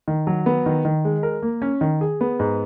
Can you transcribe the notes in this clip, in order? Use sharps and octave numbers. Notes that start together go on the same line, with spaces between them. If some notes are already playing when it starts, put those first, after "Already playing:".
D#3
F#3
B3
D#3
D#3
G#3
A#4
A#3
C#4
D#3
G#4
B3
G#2